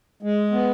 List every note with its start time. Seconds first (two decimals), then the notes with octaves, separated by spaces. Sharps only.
0.23 G#3
0.52 B3